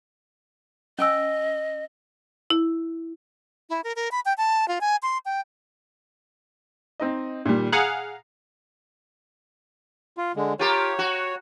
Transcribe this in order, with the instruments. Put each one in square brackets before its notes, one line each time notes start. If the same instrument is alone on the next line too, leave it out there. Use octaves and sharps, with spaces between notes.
[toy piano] C#4 G#5 E6 [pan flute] D#5
[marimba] E4
[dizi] E4
A#4
A#4
B5
G5
A5
F4
G#5
C6
G5
[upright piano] C4 D#4 D#5
A#2 D#3 G3
[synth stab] G#4 F5 F#5 [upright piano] A#5
[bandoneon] F4
D3 G#3
[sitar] F4 G4 A#4 [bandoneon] C#5
[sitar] F#4